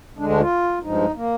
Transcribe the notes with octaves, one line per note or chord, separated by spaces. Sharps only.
D2 D3 G#3 D4
D4
F4
G2 F3 G#3 D#4
A#3